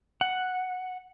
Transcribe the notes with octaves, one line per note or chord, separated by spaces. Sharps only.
F#5